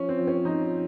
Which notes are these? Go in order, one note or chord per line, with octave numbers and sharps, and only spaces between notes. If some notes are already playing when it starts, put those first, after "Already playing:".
Already playing: F3 C#4
C4
F3
C#4
F3 D#4